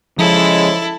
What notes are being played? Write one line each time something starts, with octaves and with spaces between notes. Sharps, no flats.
C#3 F3 G#3 E4 A4